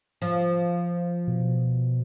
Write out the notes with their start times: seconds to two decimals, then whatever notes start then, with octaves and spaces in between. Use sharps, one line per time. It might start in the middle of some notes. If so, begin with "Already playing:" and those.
0.22 F3
1.28 B2